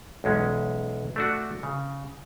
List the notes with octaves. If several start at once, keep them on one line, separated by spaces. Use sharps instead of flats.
B1 E2 G#3 C#4
A3 D4 F#4
C#3